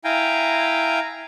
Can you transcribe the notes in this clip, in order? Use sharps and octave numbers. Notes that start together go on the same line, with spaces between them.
E4 F5 G5 G#5 A#5